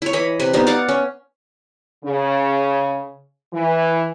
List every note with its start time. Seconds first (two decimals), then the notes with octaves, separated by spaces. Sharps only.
0.02 E4 C#5
0.13 E3 D#5 B5
0.40 C3 B4
0.53 G3 B3 D#4
0.67 D5 F5 F#5
0.89 C#4
2.05 C#3
3.52 E3